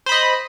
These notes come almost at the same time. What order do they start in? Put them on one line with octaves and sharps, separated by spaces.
C5 B5 D#5